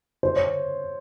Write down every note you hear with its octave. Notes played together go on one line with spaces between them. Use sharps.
C5
C#5